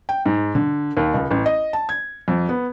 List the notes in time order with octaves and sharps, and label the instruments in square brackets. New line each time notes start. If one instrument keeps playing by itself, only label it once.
[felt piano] G5
G#2
D3
D#2
C#2
A1
D#5
A5
G#6
F2
B3